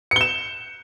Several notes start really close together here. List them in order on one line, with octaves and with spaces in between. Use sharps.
C#7 G7 E7